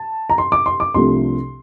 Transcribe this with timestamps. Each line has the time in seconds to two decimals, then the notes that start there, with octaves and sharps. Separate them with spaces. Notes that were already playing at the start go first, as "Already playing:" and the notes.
Already playing: A5
0.30 A#5
0.38 C6
0.52 D6
0.66 C6
0.80 D6
0.94 C2 C3 F3 A3 D4 C6